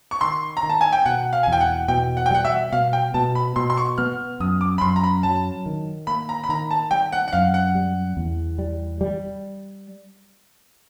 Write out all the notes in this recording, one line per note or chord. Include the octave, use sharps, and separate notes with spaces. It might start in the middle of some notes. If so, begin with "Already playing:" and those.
C#6
D#3 C6
A#5
D#3
A5
G#5
G5
B2 F#5
F5
G#5
E2
G5
F#5
B2 G5
F#5
G5
G3 F#5
E5
B2 F5
G5
B2 A5
B5
B2 C6
C6
C#6
B3 F6
F#2 D#6
D6
B5
F#2 C6
A#5
B5
F#3 A5
D#3
A#3 B5
A#5
B5
D#3 A#5
A5
G3 G5
F#5
F#5
F#2 F5
F#5
G3
E2
G3
G3